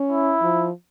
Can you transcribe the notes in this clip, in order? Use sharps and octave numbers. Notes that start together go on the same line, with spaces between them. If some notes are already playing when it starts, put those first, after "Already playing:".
Already playing: C#4
E4
F3